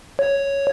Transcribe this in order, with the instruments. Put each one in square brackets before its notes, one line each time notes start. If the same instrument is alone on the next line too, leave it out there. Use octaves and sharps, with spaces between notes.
[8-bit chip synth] C#5